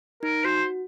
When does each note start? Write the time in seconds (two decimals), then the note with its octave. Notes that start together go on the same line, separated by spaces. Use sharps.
0.23 D#4 A#4
0.44 F#4 C5